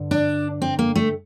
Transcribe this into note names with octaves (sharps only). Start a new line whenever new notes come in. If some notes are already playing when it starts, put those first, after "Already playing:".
Already playing: G2 D3
D4
C4
A#3
A3